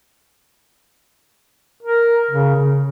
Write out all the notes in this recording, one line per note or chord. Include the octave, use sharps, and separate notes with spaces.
A#4
C#3
C#3